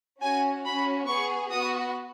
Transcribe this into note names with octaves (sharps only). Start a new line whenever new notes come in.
C#4 F#4 G#5
C#4 F#4 B5
B3 G#4 C#6
B3 F#4 D#6